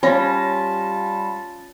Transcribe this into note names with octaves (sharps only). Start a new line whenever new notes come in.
G3 C#4 F4 G#5 A5 B5 A#6